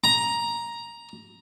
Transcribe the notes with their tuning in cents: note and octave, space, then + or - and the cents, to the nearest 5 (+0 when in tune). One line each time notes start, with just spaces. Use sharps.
A#5 +10